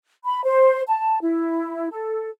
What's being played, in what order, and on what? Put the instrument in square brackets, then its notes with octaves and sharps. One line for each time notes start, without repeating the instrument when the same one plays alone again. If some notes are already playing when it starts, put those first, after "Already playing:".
[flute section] B5
C5
A5
E4
A4